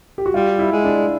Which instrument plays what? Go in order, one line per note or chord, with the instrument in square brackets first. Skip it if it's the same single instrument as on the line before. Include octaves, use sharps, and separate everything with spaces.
[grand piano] G4
F#4
[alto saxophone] G3 [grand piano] F4
[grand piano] E4
[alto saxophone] G#3
[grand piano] D4